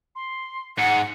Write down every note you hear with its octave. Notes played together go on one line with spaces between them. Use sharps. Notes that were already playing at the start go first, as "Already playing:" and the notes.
C6
G#2 F#5 C#7